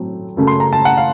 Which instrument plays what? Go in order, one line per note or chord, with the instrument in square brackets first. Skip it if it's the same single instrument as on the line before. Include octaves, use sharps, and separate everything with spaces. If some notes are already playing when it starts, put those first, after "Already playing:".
Already playing: [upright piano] A2 F#3 A3 C4
F#2 C#3 A3
C6
A#5
A5
F#5
F5